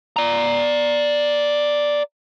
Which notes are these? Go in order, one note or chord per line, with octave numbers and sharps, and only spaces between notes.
D5 A#5